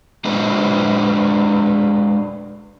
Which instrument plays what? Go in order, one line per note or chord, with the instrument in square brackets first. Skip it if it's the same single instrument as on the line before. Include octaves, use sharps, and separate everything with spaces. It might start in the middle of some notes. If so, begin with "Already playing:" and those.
[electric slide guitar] G#3 D4 A4 B4 C5 D5